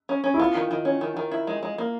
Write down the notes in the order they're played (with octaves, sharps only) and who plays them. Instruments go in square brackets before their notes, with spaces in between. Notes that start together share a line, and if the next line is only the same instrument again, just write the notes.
[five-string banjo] C#4
C#4
[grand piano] E4
[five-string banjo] B3 [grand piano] F4
[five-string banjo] D#3
D#3
C#4
D#3
D#3
E4
G#3
G#3
A#3